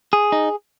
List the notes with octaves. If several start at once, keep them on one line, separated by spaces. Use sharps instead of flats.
G#4
D#4